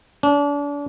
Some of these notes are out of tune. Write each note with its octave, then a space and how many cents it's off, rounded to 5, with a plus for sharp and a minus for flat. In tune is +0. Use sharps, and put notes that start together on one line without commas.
D4 -35